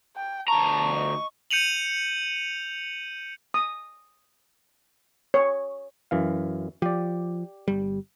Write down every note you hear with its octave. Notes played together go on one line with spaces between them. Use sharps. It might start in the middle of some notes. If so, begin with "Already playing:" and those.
G5
D2 A5 A#5 C#6
D#5
G6 C#7 D#7 F7 F#7
D#6
C#5
F#2 E3 F5
F3 G4 D5
G1 G3